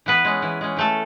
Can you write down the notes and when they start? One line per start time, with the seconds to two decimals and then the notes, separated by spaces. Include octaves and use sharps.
0.06 E3 B3 B4
0.25 G#3 C#4
0.42 E3
0.61 G#3 C#4
0.77 E3 A3 A4